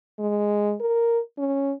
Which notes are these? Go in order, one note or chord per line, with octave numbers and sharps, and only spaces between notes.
G#3
A#4
C#4